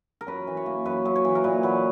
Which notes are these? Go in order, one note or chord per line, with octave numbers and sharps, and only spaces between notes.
A#4
F#2 B4
E3
C#5
A#3
F#2 B4
F#2
C#5
E3
A#4
A#2 B4
F#3 B4